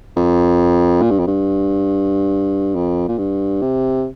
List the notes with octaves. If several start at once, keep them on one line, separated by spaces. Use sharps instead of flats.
F2
A#2
G2
F2
G2
F2
A#2
G2
C3